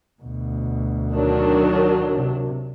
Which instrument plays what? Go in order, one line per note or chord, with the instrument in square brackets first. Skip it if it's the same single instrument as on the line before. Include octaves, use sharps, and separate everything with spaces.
[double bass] D2 B2
[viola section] D#3 F#3 D4
[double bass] C3